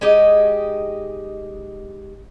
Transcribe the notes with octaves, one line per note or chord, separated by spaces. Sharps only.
G#3 D#4 G4 D#5